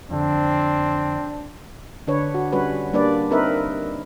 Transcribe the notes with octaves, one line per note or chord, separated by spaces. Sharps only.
F2 D3 C4 D4
D3 D4 B4 C#5
F#4
G3 C#4 F#4 B4 C#5
G3 A#3 D4 B4 D5
C4 D#4 A#4 B4 E5